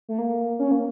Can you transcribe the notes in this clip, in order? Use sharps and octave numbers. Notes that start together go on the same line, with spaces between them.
A3
A#3
C#4
A#3